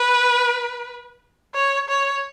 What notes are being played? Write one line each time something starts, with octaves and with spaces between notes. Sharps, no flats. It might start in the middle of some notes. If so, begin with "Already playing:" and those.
Already playing: B4
C#5
C#5